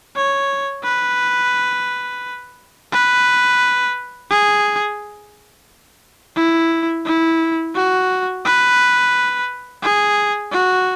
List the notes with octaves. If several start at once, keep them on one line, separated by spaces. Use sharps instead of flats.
C#5
B4
B4
G#4
E4
E4
F#4
B4
G#4
F#4